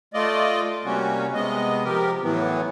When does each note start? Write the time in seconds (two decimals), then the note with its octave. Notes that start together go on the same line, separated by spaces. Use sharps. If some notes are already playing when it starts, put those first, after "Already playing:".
0.14 A3 F4 D5 D#5
0.85 C3 G3 A#3 C#4 F#4
1.34 C3 G#3 B3 D#5
1.84 C3 F3 G4 A#4
2.22 A2 E3 F#3 B3